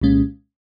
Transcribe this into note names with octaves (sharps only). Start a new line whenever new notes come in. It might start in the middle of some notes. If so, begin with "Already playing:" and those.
C2 A#2 G#3 C#4